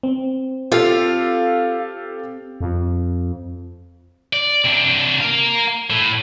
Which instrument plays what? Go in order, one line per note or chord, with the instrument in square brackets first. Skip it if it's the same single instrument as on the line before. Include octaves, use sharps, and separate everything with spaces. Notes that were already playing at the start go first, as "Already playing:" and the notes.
[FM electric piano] C4
[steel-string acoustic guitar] F4 [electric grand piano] G4 A4 F5
[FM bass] F2
[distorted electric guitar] D5
C3 D4
A#4 F5
A2